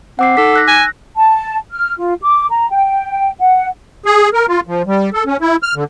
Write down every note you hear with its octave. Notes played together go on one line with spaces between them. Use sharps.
C4 F#5 D6 C7
D#4 A4 D6 B6
E6 F#6 A#6
G#5 A#6
A5
F6
F4
D6
A#5
G5
F#5
G#4
A#4
F4
F3
G3
A4
C#4
E4
F6
D3